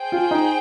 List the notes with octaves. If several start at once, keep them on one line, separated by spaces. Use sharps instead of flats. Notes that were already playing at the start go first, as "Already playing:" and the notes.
Already playing: G#4 C5 G5
F4
D#4